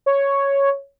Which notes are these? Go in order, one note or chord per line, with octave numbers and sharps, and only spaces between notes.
C#5